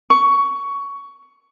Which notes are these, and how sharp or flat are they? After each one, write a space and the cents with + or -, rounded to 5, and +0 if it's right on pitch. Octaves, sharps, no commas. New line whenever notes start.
C#6 +15